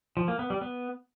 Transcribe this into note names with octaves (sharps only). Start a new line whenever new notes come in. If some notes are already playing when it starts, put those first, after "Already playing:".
F3
A#3
B3
G3
B3